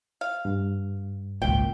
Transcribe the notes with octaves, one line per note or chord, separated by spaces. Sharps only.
F5
G2
G#1 C#2 A#2 G5